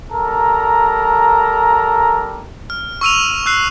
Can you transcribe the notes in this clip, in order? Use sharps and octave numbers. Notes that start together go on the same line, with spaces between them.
G3 A4 A#4 A#5
F6
C#6 E6 D#7 F7
E6 F#6 C7